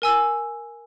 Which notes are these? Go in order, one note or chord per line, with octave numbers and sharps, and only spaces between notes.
A#4 G#5 E6